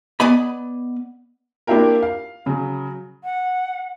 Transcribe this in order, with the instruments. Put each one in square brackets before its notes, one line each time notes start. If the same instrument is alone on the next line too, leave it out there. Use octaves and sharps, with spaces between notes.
[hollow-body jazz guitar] B3 D5 D#5 G#5 B5
[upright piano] A#3 D4 E4 F4 G4 A#4
F5
C#3 F#3
[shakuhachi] F#5